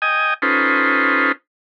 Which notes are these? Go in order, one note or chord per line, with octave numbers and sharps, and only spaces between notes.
D#5 G5 G#5 D#6
C#4 D#4 F4 A4 B4 C5